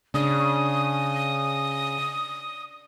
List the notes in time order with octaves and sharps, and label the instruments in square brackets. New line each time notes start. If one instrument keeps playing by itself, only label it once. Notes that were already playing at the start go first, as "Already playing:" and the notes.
[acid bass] C#3 [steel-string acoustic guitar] D4 [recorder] D#6